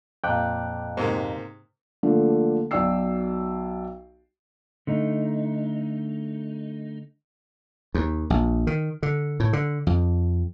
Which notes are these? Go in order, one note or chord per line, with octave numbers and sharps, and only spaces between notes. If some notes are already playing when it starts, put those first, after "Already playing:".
F2 A#2 G5 D6 F#6
G#2 C3 A#3
D3 F3 A3 A#3 D4
B1 F#3 D5 G5 E6 C7
D3 A3 D#4
D#2
A#1
D#3
D3
A2
D3
F2